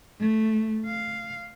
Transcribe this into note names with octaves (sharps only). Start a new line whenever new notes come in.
A3
F5